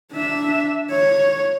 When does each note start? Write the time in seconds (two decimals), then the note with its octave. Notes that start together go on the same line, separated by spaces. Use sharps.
0.13 D4 E5
0.91 C#5